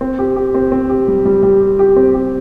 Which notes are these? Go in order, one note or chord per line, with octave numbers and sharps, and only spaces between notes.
C4
G4
G4
C4
C4
G4
G3
G3
G3
G4
G4
C4
G4